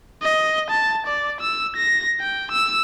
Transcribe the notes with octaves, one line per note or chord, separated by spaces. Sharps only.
D#5
A5
D5
E6
A#6
G5
E6